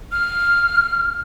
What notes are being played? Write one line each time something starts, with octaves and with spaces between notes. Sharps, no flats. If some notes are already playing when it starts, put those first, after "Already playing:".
F6